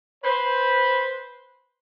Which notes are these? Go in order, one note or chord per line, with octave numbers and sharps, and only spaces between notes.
B4 C5